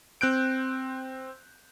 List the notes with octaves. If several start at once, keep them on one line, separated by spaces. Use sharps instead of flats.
C4 F#6 G6 D7